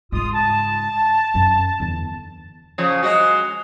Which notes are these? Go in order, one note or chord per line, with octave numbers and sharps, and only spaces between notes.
G#2 C#3 F4 D#6
A5
F#2 C#4
E2 D3
C#3 F3
F#3 G#3 F#4